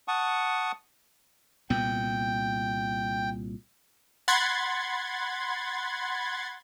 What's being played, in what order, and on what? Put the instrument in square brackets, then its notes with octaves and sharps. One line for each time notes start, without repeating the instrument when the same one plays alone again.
[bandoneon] F#5 A5 C#6 D#6
[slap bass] C2 A#2 B3 [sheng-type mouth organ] G5
[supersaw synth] F#5 B5 C6 G#6 A6